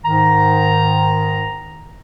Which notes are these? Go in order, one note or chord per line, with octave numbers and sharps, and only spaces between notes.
G#2 D#3 A#5